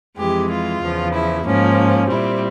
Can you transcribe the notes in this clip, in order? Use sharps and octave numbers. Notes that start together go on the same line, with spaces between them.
F2 E3 G#3 G4
F4
E2 C#3 F3
E4
G#2 F3 A#3 C#4
A#2 G3 C4 E4